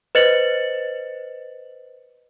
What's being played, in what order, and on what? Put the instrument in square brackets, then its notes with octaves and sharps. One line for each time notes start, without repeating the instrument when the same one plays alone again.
[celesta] B4 C5 D#5 A6 C#7 F#7